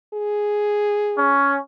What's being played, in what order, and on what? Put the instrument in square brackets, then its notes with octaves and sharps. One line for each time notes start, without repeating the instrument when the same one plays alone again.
[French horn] G#4
[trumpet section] C#4